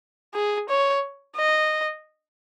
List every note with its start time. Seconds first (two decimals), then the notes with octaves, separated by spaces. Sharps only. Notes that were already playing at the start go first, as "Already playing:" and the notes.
0.34 G#4
0.69 C#5
1.36 D#5